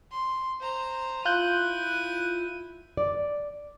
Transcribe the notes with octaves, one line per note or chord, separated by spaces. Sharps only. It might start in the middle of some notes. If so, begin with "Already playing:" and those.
C6
C5 A#5
E4 F4 F#6 G6 D#7
D5